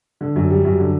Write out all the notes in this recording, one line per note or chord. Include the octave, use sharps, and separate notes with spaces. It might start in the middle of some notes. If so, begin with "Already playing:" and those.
D3
F#2
G3
F#2
D3